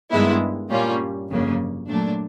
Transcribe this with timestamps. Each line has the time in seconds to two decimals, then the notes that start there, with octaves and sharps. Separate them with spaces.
0.11 G2 D#3 G#3 B3 E4
0.70 A#2 G3 A#3 C#4 F4
1.29 G1 F2 C#3 F#3 A#3
1.88 A#2 F#3 A3 D4